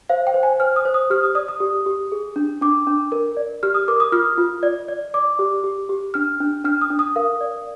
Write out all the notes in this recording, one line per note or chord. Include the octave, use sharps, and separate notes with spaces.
C5 F5
G5
C5
G#5
C5 F6
D#6
C5
D#6
G4 F6
D#6
D5 D#6
D#6
G4
G4
G#4
D4
D4 D6
D4
A#4
D5
G4 F6
D#6
A#4 D6
D#6
F4 F6
F4
D5
D5
D5 D6
G4
G4
G4
D4 F6
D4
D4 F6
D#6
D4
D#6
A#4 F5
D5